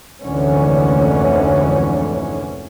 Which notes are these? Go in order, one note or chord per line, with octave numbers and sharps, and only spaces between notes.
F1 D2 G#2 D3 E3 C#4